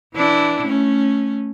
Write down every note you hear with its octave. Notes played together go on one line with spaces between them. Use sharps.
E3 D4 E4
A3 C#4